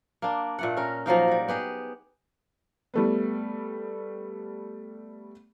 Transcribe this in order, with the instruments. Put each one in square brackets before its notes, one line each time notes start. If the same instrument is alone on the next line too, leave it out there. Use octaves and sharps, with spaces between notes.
[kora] A#3 D4
A#2 A3 F#5
C#4 A#4
F3 F#3 A#3 D#4
F#3 G3
B3 G4 G#4
[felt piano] G3 A3 B3